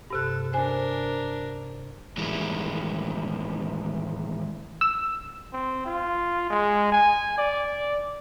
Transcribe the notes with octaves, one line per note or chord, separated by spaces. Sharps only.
G2 C3 A4 F#6
D4 A#4 C5 G#5
A2 D#3 E3 G3 G#3
E6
C4
F4
G#3
G#5
D5